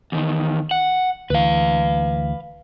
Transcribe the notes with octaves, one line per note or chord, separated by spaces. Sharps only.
E2 D#3
F#5
D2 E3 B4 F5